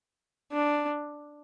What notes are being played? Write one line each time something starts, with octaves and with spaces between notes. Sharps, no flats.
D4